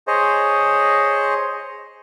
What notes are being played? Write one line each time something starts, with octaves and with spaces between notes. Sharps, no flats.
G#4 C5 C#5 D#5